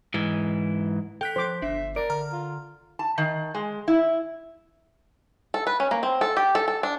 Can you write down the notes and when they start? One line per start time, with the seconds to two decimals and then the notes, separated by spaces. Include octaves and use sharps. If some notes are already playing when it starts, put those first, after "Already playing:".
0.14 G#2 E3
1.21 A4 G5 F#6 B6
1.36 F3 C5 D6
1.62 G1 D4 E5
1.96 A#4 D5 D7
2.10 D3 A#5 F6
2.32 F4
2.99 A5
3.18 D#3
3.55 G#3
3.88 E4
5.54 A4
5.67 B4
5.80 C#4
5.91 A#3
6.03 C4
6.21 A4
6.37 G4
6.55 A4
6.68 A4
6.83 D4